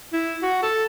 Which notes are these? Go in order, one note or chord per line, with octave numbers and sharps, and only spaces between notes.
E4
F#4
A4